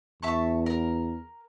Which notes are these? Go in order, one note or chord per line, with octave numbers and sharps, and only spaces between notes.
E2 E5 A5 C#6
A#4